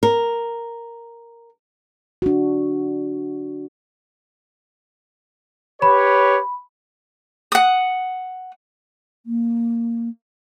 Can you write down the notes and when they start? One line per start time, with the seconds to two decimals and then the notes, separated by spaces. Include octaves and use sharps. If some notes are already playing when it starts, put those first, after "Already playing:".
0.03 A#4
2.22 D4 F#4
5.82 G4 B4 C#5 B5
7.52 F#5 D#6
9.26 A#3